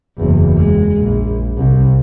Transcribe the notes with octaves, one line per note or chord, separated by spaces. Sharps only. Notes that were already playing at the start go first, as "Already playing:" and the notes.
F#1 E2
G#3
A#1
C2